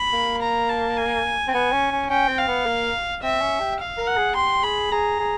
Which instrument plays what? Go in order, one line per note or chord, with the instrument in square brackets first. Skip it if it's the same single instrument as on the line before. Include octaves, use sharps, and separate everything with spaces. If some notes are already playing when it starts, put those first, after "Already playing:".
Already playing: [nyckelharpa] B5
[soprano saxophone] A#3
[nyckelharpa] A#5
A5
G#5
[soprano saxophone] C4
[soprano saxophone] B3 [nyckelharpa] G#5
[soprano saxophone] C#4
C#4
[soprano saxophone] C#4 [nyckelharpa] G5
[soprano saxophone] C4
[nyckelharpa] F5
[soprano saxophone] B3
A#3
[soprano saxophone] C4 [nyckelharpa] E5
[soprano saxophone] C#4
G4
[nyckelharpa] F5
[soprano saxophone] A#4
[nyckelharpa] F#5
[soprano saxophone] G#4
[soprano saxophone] G4 [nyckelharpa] C6
[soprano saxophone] G#4 [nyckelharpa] B5
[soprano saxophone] G#4 [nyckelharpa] A#5
[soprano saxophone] G#4